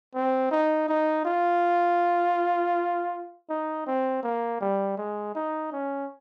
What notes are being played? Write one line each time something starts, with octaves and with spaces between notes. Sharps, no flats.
C4
D#4
D#4
F4
D#4
C4
A#3
G3
G#3
D#4
C#4